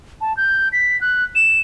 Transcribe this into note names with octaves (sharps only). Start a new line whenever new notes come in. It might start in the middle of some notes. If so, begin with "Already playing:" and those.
A5
G6
B6
F#6
E7